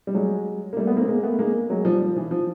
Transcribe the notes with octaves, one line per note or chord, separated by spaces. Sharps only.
G3
F#3 G#3
A#3
G3 A3
A3 B3
A#3 C4
G#3 A#3
A3 B3
G#3 A#3
F#3 G#3
F3 G3
F3
E3
F3